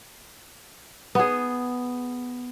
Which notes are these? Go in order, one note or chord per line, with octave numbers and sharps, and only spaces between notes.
B3 G#4